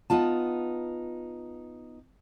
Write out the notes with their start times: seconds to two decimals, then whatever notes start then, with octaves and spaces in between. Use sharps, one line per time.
0.10 B3 D#4 F4 A5